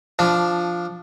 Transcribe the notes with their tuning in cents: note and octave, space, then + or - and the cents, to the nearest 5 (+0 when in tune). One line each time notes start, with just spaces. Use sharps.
F3 +0 D4 +0